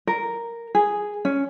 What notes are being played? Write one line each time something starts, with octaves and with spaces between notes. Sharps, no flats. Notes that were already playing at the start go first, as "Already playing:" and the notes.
A#4
G#4
C#4